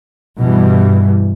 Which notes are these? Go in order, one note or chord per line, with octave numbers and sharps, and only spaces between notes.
G2 B2 E3 G3